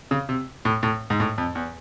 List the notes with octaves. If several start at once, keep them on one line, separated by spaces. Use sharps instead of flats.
C#3
C3
A2
A2
G#2
A2
F2
E2